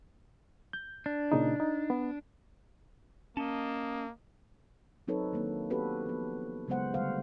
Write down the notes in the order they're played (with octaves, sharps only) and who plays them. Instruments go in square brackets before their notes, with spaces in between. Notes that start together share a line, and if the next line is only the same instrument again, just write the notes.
[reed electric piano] G6
[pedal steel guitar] D4
[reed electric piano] A#2 C#3 D#4
D#4
B3
[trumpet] A#3 [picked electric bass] C#4 [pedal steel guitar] D#5 A5
[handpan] F#3 C4 D#4 A4 B4 C#5
D#3 F#3 A#3 D4
B3 C4 F#4 G4 A4 B4
F3 B3
C#3 F#3 G#3 B3 C5 F#5
D3 G3 A3 C5 F5 F#5